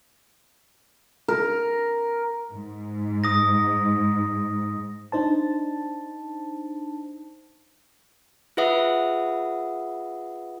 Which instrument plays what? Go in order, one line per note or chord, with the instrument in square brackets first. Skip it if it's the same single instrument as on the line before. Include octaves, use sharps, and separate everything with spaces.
[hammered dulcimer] A#4
[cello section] G#2
[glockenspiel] D#6 A#6
[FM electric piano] D4 D#4 C5 A5
[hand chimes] F4 G#4 B4 E5 F#5 D#6